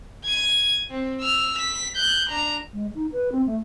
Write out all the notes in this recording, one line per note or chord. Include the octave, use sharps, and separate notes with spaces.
G#6 D#7
C4
E6 F6
B6
F#6 G6
D4 A#5
G#3
D#4
B4
C4
A3